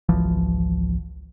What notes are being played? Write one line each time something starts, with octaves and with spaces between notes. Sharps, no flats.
G#1 C#2 E3 F3